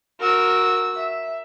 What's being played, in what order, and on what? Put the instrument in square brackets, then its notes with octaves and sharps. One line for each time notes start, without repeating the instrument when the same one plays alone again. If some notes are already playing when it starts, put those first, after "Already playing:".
[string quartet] F#4 E6 [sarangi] A#4
[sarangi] E5